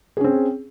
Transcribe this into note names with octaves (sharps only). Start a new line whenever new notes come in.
C4 C#4 G#4